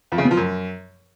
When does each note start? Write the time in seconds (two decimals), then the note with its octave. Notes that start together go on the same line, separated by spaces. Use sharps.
0.12 F2
0.18 C#3
0.24 B2
0.31 F3
0.37 F#2